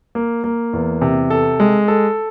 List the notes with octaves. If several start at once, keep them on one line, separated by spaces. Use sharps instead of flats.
A#3
A#3
E2
C3
A4
G#3
A4